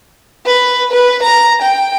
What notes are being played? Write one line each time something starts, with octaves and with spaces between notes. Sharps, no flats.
B4
B4
A#5
G5